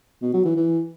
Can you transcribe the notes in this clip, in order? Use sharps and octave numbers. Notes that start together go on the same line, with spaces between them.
B2
F#3
E3
E3